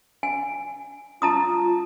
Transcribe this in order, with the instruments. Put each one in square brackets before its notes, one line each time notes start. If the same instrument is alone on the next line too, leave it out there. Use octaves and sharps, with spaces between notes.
[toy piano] G#5
[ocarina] F4 [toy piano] A5 A#5 D#6